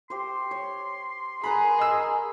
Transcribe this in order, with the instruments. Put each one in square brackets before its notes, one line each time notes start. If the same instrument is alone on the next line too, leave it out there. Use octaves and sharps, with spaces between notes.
[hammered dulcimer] G4 C5 [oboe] C6
[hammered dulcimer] C#5
[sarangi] G#4 [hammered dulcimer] A#4 B4 A#5 [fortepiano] B5
[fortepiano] D#5 E6